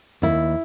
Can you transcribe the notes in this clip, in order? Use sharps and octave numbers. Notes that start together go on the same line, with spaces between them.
D#2 E4